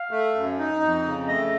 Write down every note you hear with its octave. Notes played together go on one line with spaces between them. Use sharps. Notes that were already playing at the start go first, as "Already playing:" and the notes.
Already playing: F5
A3
F#2
D#4
F2
C#3
A3 D#5